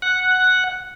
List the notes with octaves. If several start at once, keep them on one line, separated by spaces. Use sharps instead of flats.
F#5